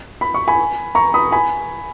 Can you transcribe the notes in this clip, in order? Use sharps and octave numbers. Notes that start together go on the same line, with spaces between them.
B5
C#6
G#5 B5
A#5 C#6
B5 D#6
G#5 B5